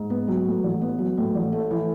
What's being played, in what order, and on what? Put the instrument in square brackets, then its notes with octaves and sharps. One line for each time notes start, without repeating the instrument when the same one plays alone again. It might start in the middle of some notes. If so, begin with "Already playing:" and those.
Already playing: [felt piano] G#2
B3
F#3
A2
A1
B3
F#3
A2
A1
A3
E3